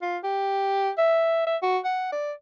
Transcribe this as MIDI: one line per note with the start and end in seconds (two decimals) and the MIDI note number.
0.02 0.18 65
0.24 0.91 67
0.98 1.46 76
1.47 1.57 76
1.63 1.79 66
1.85 2.08 78
2.12 2.32 74